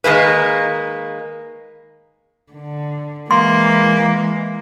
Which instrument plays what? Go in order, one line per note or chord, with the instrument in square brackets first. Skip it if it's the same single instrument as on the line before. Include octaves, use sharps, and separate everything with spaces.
[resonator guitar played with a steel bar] D#3 G#3 A#3 B4
[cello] D3
[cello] E3 G#3 [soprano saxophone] A#3 [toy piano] C6